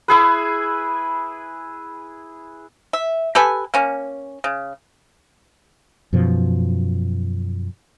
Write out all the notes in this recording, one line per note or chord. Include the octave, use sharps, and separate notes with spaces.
E4 G#4 B4
E5
G4 A4 B4 G#5
A#3 C#4
C#3
F#2 B2 F3